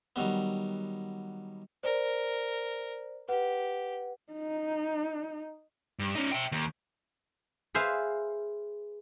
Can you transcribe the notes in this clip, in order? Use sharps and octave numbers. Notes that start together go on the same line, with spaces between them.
D#3 F#3 G3 B3
A#4 C5 D5
G4 B4 F#5
D#4
G2
C#4 D#4
E5 G5
D#2
G#4 B4 C5 E5 F5